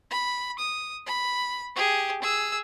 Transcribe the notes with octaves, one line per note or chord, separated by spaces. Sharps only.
B5
D#6
B5
G4 G#4
G#4 E6